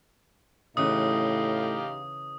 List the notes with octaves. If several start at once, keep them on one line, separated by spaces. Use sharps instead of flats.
A2 C#3 E3 D#4 G4 F5 D#6